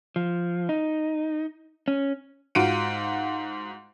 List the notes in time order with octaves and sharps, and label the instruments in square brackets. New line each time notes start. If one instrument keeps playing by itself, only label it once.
[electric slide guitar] F3
D#4
C#4
[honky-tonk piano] G#2 F4 F#4 F#5 D7 D#7